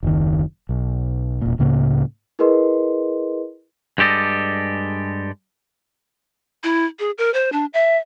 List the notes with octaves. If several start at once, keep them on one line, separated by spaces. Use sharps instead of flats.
F#1 D#2 D#3
B1
E1 A#2
C#2 A2 C#3 A#3
E4 G#4 A#4 B4 D#5 C6
G2 G#3 G4 A4 D5 D#5
E4
G#4
A#4
C5
D4
E5